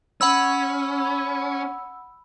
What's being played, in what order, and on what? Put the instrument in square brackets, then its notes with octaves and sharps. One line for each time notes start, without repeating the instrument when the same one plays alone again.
[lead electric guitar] C#4 [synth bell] F#5 B5 E6